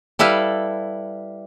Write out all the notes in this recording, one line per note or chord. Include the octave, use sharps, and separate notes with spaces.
G3 E4 A4 B4 F5